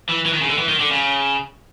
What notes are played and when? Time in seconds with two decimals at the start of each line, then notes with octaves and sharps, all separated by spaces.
0.09 E3
0.26 E3
0.33 D#3
0.41 C#3
0.50 D3
0.58 E3
0.68 D#3
0.80 D3
0.91 C#3